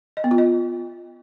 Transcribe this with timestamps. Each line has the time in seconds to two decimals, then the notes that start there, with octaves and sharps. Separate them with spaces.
0.17 D#5
0.24 B3
0.31 F4
0.38 D#5